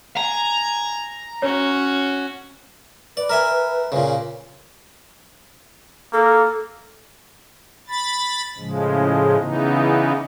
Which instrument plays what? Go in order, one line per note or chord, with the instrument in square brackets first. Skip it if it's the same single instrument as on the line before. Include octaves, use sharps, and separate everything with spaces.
[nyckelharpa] G#5 [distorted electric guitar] A#5
[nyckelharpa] C#4 F#4 [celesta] C#5
[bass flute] B4 [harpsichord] D5
[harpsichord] A#4 E5 G#5
A#2 C#3
[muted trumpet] A#3 [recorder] A4
[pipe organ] B5 A6
A2 C#3 F3 G#3
C#3 E3 B3 D#4